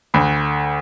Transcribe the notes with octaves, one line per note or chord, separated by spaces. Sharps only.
D2 B5